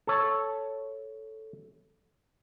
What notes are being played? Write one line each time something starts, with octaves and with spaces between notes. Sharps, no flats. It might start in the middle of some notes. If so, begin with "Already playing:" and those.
A4 C#5